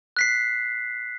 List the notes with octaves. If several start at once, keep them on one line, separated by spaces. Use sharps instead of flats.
F#6 B6 C7